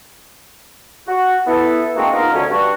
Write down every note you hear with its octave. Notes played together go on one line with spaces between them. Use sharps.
F#4
B3 E4 A4
G#3 A#3 C4 D4 F#4
B3 D#4 F4 A#4
D2 C#4
G2 F#4